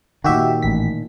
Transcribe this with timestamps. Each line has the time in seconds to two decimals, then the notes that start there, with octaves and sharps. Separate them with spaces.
0.24 A#2 D#3 F#4 G4 E5
0.62 A1 B6